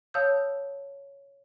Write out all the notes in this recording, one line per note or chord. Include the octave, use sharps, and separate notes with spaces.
C#5 F5 A5 D#6 E6 G6